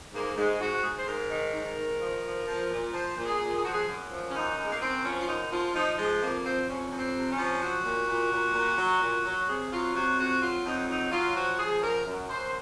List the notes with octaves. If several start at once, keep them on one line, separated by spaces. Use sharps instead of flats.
G#2 A#3
G#2 G#3
G#2 F#4
G#2 G#4
C5
G#2 A#4
D#3
G#2
D#3
F3
F3
F3
A#2
F3 C5
A#2
G#4
A#2
G#4
F3 F#4
G#4
F#2
F3
C#4
F#2 D#4
F#2
G#3
A#3
F#2 C4
F3 C#4
F4
F#2 D#4
F3 F4
F3 D#4
F3 G#3
F2 A#3
F3 C4
F2 C#4
F2
C4
C3
C#4
F3
F#3 F#4
A#2
A#2
A#2
A#2
F#3
A#2
F#3
C3 G#4
F#3 F4
C3 F#4
F2 F#4
F#3 F4
F2 D#4
F#3 D#4
F#3 F4
F3 F#4
F3 G#4
F#2 A#4
F#2
F#2 C5